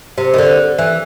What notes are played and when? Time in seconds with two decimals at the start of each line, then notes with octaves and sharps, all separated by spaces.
0.18 C3
0.34 D#3
0.38 D3
0.78 E3